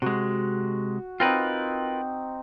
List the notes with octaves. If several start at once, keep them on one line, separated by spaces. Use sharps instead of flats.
C3 G#3 F#4
C4 D#4 F4 A#4 B4